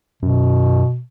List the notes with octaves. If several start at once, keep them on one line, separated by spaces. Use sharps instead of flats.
F#2 B2